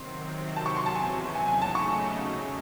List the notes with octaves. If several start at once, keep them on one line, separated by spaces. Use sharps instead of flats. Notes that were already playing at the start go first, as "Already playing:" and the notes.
Already playing: C3 D#3 F#3 C4 C6
E2 C3 F#3 A5
C#6
C6
A5
G#5
C#3 F#3 A3 D#4 G#5
G#5
A5
C#6
D#2 C#3 G#3